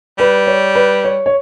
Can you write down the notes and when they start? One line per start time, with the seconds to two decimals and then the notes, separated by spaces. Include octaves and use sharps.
0.18 G3 B4
0.47 C#5
0.75 B4
1.04 C#5
1.26 C#5